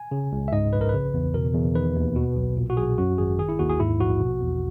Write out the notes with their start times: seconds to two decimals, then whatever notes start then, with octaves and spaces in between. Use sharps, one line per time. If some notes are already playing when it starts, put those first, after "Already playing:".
Already playing: G#5
0.11 C#3
0.32 C#2
0.48 E5
0.52 G#2 D#5
0.73 A#1 B4
0.81 A#4
0.89 C#3 B4
1.14 E2
1.34 B2 A#4
1.54 E2
1.75 D#3 B4
1.96 D#2
2.16 B2
2.36 B1
2.57 A#2
2.70 F#4
2.77 B1 G#4
2.98 F#2 F#4
3.18 G#1 G#4
3.39 D#3 G#4
3.49 E4
3.59 D#2 F#4
3.69 G#4
3.80 G#2 E4
4.00 A#1 F#4
4.20 B2
4.41 E2